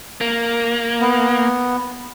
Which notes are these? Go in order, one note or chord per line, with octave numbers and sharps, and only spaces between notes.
A#3
B3